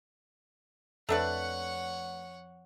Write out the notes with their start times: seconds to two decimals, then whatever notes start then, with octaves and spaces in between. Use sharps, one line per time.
1.09 F2 A3 D4 B4 C#5 F#5